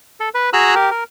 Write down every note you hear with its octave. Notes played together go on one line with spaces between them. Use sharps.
A4
B4
F#4 G#4 A#5 E6 F#6
G4 A#4
A#4